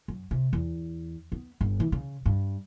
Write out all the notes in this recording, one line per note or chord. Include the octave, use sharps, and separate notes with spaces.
F#2
C3
E2
B3
G1
E3
C#3
G2